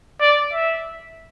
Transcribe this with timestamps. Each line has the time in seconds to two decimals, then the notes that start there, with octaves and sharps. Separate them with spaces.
0.21 D5
0.53 E5